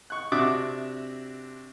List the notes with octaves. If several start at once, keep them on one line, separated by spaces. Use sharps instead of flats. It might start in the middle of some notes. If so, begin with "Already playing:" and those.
C#6 F#6
C3 D4 F#4 E5 D6 F#6